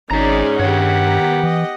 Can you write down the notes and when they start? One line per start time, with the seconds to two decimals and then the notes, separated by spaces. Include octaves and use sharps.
0.11 G#1 G#2 C#4 D#4 G#4 D5 A#5
0.60 G2 D#3 G4 C#5 F#5
1.07 B3 A#5
1.44 E3 D#5